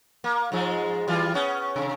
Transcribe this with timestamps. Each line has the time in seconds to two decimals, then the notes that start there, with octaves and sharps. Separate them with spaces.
0.24 A#3
0.52 G#2 F3 G#3
1.08 E3 G3 F4
1.34 B3 C#4
1.76 C3